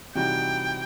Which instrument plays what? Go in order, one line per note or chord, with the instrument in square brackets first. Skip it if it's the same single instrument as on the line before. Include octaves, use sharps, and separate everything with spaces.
[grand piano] C3 E3 G3 D#4 F#4 [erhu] G5